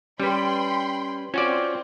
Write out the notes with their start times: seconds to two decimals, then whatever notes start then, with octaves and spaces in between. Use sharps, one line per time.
0.20 G3 C#4 B4 G5 B5 C6
1.34 C4 C#4 F4 F#4 D5